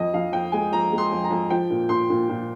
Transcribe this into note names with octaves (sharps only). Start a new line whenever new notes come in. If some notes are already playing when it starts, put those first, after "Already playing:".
Already playing: F2 D#5
F2 F5
F2 G5
G#3 G#5
F2 A#5
G#3
C6
F2
A#5
F2
F3 G5
A#2
A#2 C6
A#2
A#2